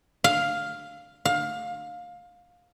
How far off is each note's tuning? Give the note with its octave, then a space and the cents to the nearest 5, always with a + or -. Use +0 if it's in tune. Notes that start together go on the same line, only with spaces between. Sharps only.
F5 +5
F5 +20